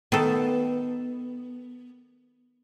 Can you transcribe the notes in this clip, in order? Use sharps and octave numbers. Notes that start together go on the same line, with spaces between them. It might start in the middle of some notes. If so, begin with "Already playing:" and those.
D#3 B3 A4